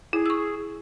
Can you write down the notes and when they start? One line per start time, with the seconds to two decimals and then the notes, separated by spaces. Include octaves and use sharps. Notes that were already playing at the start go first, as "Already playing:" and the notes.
0.13 E4 G#4
0.26 C#6 E6